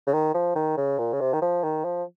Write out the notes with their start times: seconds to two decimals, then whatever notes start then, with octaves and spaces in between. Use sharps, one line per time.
0.07 C#3
0.14 D#3
0.35 F3
0.56 D#3
0.77 C#3
0.99 A#2
1.13 C#3
1.21 C3
1.33 D#3
1.42 F3
1.64 D#3
1.85 F3